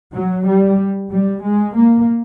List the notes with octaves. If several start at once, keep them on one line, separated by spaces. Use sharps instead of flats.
F#3
G3
G3
G#3
A#3